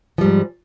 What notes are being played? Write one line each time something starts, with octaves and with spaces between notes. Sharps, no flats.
G#2 F3 G3